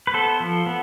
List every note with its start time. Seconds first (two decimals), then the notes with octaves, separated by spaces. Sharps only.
0.07 B4
0.14 B3 A4 C5
0.40 F3
0.66 B3